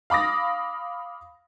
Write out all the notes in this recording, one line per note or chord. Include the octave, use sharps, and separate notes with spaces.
F5 B5 D6 D#6 A#6